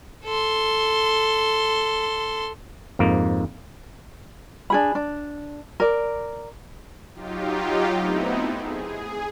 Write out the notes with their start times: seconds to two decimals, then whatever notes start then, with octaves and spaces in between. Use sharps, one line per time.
0.25 A4 C6
2.99 F2 G#2 A#3
4.70 D4 G#4 B5
4.95 D4
5.80 A#4 D5
7.14 F#3 D#4 F4 G4
7.97 A3 B3 C4 D#4 E4
8.59 G#4